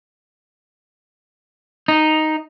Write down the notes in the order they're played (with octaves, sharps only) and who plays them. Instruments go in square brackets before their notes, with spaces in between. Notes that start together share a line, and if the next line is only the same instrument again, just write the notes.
[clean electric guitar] D#4